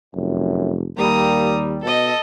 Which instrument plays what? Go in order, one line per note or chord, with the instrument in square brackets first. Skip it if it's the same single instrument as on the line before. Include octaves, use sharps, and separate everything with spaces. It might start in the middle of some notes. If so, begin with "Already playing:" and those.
[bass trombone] F1 [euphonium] F#2
[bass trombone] D#2 [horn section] G3 [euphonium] A#3 [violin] A#5 D#6
[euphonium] B2 [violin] A4 D#5